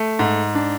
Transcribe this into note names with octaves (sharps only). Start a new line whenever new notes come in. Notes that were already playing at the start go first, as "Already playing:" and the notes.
Already playing: A3
G#2
D4